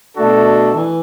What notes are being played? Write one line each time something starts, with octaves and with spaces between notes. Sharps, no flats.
B2 A3 D4 F#4 A4
E3